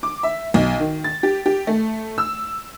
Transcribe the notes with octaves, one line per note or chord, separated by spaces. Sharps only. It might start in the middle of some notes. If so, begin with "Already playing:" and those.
D6
E5
B1
D#3
A6
G4
G4
A3
E6